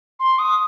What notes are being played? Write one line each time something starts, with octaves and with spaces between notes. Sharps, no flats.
C6
D#6